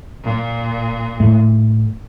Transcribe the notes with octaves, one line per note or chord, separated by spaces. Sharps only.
A#2
A2 A3